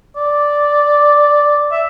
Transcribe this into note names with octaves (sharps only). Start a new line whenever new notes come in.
D5
E5